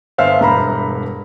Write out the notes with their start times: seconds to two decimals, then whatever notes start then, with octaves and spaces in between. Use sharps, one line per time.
0.18 G1 C5 E5 F5 F6
0.39 E1 G2 A#5 B5